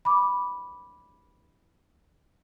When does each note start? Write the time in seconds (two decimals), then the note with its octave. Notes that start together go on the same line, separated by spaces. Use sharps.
0.05 B5 D6